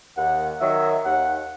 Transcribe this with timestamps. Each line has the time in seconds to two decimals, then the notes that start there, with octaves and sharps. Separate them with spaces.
0.17 D#2 F#5
0.60 D#3 F#3 E5
1.05 D#2 F#5